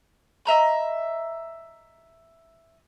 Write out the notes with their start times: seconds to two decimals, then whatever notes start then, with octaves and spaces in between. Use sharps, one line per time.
0.45 D#5 E5 A#5 B5